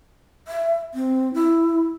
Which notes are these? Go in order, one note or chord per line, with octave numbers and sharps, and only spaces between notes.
E5
C4
E4